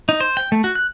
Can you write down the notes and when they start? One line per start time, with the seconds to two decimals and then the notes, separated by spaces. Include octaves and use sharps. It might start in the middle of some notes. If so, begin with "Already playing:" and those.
0.09 D#4
0.20 C5
0.37 G5
0.52 A3
0.64 F#4
0.75 F#6